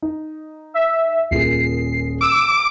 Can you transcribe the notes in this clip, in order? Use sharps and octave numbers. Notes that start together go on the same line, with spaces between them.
D#4
E5
D#1 A#2 G#4 C7
D6 E6